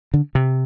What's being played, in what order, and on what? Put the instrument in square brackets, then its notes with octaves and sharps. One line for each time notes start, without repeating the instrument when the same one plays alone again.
[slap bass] D3
C3